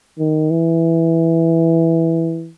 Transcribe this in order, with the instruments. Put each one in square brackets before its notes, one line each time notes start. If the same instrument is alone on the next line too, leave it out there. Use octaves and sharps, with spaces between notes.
[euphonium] D#3
E3